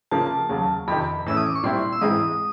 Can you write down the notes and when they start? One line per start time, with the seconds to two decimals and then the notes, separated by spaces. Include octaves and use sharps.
0.11 C#3 F3 A#3 A5
0.49 D#2 C#3 F#3
0.88 F2 C3 D#3 B5
1.26 A2 E3 A3 C#4 E6
1.37 D#6
1.47 D6
1.55 C#6
1.63 A#2 G3 C4 E4 C6
1.93 E6
2.01 G#2 E3 G#3 C4 E4 D#6